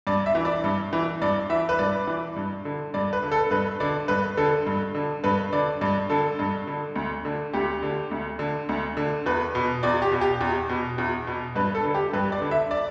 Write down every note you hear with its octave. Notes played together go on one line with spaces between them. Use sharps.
G2 D5
E5
E3
D5
G2
E3
G2 D5
E3 E5
B4
G2 D5
E3
G2
D3
G2 D5
B4
D3
A4
G2 B4
D3 D5
G2 B4
D3 A4
G2
D3
G2 B4
D3 D5
G2 D5
D3 A4
G2
D3
D2
D3
D2 G4
D3
D2
D3
D2
D3
E2 B4
B2
E2 D5
G4
B2
G4
E2
B2
E2
B2
G2 B4
A4
D3
G4
G2 B4
D5
D3
E5
D5